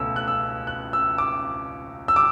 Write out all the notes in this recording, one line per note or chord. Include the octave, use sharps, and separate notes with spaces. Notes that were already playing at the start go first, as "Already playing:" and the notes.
Already playing: C#2 B2 A3 C#4 E6
F#6
E6
F#6
E6
D6
E6
D6